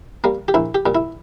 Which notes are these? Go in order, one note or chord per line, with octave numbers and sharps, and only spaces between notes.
G3 A#3
G4
A#1 E4
G4
A#2 G3
E4